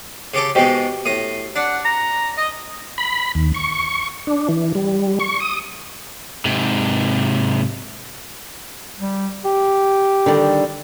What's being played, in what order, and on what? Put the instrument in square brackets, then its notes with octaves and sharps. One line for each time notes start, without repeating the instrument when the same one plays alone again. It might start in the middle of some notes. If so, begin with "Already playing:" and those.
[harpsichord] C#3 G4 A4
[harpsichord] G#2 B2 G#3 [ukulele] F#4 G4 D#5
[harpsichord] A2 D#6
[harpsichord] D4 [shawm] F#5
[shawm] A#5
D#5
[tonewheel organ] B5
D#2
C#6
D4
E3
G3
C#6
D#6
[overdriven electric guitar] G#2 C3
[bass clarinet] G3
G4
[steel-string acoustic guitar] D3 D#3 G3